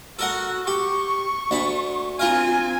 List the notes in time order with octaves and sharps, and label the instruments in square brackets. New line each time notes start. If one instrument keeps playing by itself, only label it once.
[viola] F#4 [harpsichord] A4 A#4 F#5
[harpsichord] G4 [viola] C#6
[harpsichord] D2 A5 B5
[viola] C4 G#5 [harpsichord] F4 A#4 F5